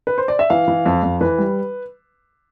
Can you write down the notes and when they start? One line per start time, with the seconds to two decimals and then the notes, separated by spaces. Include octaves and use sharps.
0.07 B4
0.18 C5
0.28 D5
0.39 E5
0.50 E3 F5
0.68 E3
0.86 F2
1.03 F2
1.21 E3 B4
1.38 G3